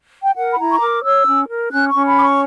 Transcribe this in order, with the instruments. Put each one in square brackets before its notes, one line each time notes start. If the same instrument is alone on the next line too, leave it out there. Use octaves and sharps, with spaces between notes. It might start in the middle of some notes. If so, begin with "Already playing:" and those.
[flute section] G5
A#4 F#5
B5
E4 A#5
C#6
A#4 D6
C#5 E6
C#4
A#4
C#4 F#6
C#4 C#6
B5
C#5 D6
C#6